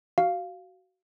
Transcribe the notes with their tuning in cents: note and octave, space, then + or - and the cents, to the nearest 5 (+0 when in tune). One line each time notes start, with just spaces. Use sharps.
F#4 +15 F5 +0